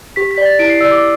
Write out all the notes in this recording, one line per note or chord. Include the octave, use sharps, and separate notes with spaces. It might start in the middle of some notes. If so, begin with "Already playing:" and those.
G4 B6
B6
D5
A6
E4 D7
C7
D5 E6
D6